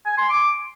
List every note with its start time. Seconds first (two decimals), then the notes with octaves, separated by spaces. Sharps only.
0.06 G#5
0.18 C6
0.30 D6